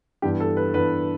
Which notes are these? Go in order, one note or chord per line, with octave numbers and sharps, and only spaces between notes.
G2 E3 B3 G4
A4
B4
G2 E3 B3 B4